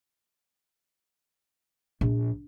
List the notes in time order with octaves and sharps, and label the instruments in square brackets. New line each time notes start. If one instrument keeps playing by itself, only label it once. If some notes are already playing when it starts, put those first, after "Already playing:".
[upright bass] A#1